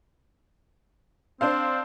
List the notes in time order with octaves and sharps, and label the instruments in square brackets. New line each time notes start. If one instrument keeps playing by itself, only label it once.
[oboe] C4 [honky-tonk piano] D4 C5 F5